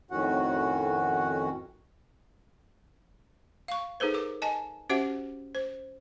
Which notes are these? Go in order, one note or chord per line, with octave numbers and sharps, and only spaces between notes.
F2 A2 D#3 C#4 F#4 F#5
F5 C#6
D#4 G#4 A4 B4 C5
A#4 D6
D#5 G#5 A5
C#4 F#4 G4 C5 E5 F#5
C5